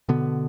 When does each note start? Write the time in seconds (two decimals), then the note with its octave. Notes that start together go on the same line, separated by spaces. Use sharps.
0.09 B2 D3 B3